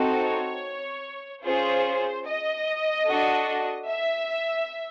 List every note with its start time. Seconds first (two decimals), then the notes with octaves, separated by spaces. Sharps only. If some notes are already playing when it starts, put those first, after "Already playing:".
Already playing: C4 D#4 F#4 A4
0.23 C#5
1.45 C#4 F4 G#4 C5
2.26 D#5
3.07 D4 F#4 A4
3.88 E5